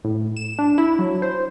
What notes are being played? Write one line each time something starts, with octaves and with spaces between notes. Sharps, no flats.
A2
E7
D4
E4
F#3
C5